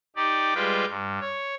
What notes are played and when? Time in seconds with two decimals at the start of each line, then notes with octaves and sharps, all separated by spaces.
0.16 D#4 G4 D5
0.55 G3 G#3 F4 B4 G5
0.89 G2
1.20 C#5